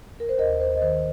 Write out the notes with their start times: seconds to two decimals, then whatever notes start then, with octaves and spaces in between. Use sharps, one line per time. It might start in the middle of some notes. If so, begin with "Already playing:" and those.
0.20 A#4
0.29 C5
0.38 D#2 A#4 D#5
0.60 C5
0.76 D#5
0.82 D#3 C5